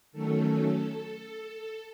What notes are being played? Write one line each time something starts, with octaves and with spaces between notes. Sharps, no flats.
D#3 F#3 A3 C#4 A4